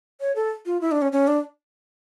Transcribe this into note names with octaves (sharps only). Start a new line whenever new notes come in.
C#5
A4
F4
E4
D4
C#4
C#4
D4